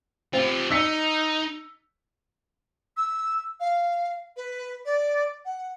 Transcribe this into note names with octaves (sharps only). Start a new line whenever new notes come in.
C4 F4 G4
D#4 E6 B6 C#7
E6
F5
B4
D5
F#5